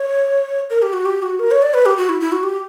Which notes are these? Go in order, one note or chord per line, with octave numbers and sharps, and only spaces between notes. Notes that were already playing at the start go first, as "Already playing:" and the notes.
Already playing: C#5
A#4
G4
F#4
G4
F#4
A#4
C#5
D5
B4
G4
F#4
E4
E4
F#4
G4